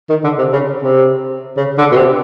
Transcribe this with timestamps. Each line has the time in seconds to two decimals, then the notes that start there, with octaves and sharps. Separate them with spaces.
0.09 D#3
0.24 D3
0.38 C3
0.53 C#3
0.83 C3
1.57 C#3
1.78 D3
1.92 B2
1.96 C3